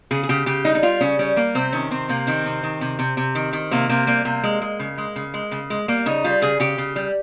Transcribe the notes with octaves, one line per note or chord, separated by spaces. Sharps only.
C#3 G#4
G#4
C#3 G4
C#3 G4
G3 D#4
D#4
G3 F4
C#3 C#4
G3 C#4
G3 A#3
C3 C4
D#3 C#4
C3 C4
C3 A#3
D#3 C4
C3
D#3
C3
C3
C3
D#3
D#3
C3 A#3
C3 A#3
G3 A#3
C3 A#3
G#3
G#3
C#3
G#3
C#3
G#3
C#3
G#3
G3 A#3
C#3 D#4
G3 F4
C#3 G#4
C#3 G4
C#3
G3